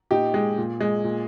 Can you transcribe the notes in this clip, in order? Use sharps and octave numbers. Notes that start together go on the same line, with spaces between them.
A#2 D#4 G4
G#3
A#2
G#3
A#2